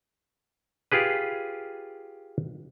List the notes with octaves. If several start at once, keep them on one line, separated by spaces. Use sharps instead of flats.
F4 G4 G#4 B4